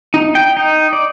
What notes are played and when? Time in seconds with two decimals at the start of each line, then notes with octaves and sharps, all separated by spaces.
0.14 D#4
0.35 G5
0.57 D#4
0.93 D5